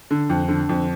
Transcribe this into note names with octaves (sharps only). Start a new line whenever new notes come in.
D3
F2
D3
F2